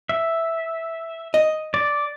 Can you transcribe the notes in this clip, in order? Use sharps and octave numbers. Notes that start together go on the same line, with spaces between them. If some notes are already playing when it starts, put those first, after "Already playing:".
E5
D#5
D5